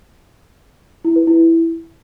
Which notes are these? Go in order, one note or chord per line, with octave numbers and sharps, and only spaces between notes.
E4
B4
E4